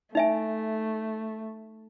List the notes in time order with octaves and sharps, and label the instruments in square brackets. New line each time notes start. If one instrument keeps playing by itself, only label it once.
[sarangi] A3 [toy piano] D#4 E5 G#5